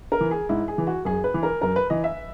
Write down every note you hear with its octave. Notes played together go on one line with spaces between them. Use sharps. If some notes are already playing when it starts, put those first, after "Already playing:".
A#4
E3
G#4
G#2 E4
G#4
E3
F#4
F#2 G#4
B4
E3
A#4
F#2 A#4
B4
E3 D#5
E5